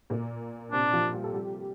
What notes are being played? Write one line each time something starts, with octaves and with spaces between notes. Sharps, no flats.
A#2 A#3
C3 C4 D4
F3 F4
G3 G4
A4
G3 G4